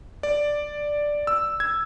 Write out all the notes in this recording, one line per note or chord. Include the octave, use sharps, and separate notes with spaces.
D5
E6
G#6